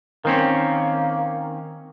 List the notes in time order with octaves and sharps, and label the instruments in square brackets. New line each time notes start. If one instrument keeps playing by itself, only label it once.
[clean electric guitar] D#3 C4 C#4 [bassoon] A#3